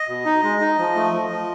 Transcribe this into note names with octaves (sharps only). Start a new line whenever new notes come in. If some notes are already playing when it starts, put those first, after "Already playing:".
Already playing: D#5
B2
D#4
G#3
D#4
F3
A3
F3
F3